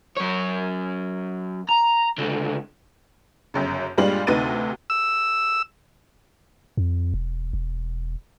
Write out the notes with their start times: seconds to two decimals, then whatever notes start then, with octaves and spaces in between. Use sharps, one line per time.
0.17 F#2 C#5
1.69 A#5
2.18 C#2 D3
3.54 G1 F#2 C#3
3.98 G2 A#2 G3 G#3 F4 F#7
4.27 D2 C3 D#4 B4 A6 D#7
4.90 E6
6.77 F2
7.14 E1
7.53 E1